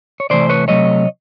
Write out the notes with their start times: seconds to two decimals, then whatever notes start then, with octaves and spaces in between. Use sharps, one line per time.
0.20 C#5
0.30 C3 E3 A3 C5 D5
0.49 B4 C#5
0.68 C3 D#3 F#3 A3 C#5 D#5